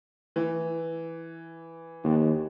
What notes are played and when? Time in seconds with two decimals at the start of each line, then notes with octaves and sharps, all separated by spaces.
0.36 E3
2.04 D#2